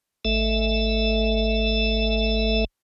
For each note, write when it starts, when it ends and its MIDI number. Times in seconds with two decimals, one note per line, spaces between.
0.25 2.65 32
0.25 2.65 57
0.25 2.65 69
0.25 2.65 76